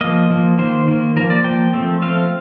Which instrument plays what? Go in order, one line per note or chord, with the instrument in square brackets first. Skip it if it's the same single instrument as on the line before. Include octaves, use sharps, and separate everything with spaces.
[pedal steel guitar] F3 A#3 D#5
F3 A#3
D#3 A#3 C5
D#3 A#3
F3 A#3 A#4
D5
F3 A#3 G5
F3 A3 C4
F3 A3 C4 F5